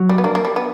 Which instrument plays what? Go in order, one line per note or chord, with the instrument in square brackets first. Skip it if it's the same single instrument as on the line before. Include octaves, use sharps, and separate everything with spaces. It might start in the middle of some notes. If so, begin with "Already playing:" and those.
Already playing: [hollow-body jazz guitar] F#3
[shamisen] G3
B3
[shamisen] A#3 [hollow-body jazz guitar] D4
[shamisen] A#3
G3
B3